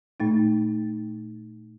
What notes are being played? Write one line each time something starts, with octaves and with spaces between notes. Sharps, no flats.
A#2 A3 D#4